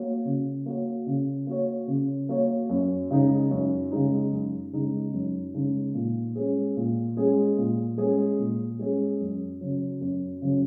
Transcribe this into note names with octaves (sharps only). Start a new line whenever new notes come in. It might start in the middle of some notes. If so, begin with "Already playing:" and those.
Already playing: A#3 F#4 C#5
C#3
A#3 F#4 C#5
C#3
A#3 F#4 C#5
C#3
A#3 F#4 C#5
F#2
C#3 G#3 D#4
F#2
C#3 G#3 D#4
F#2
C#3 G#3 D#4
F#2
C#3 G#3 D#4
A#2
G#3 C#4 G#4
A#2
G#3 C#4 G#4
A#2
G#3 C#4 G#4
A#2
G#3 C#4 G#4
F#2
C#3 F#3 C#4
F#2
C#3 F#3 C#4